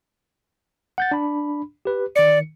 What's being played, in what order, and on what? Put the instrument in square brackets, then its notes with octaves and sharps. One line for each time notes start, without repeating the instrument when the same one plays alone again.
[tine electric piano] F#5 G6 A6
D4 B5
G4 B4
[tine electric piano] D#3 C#7 [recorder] D5